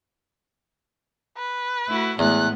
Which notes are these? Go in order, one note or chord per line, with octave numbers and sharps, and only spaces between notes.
B4
A3 E4 F#4
E2 A2 G#3 B3 F#6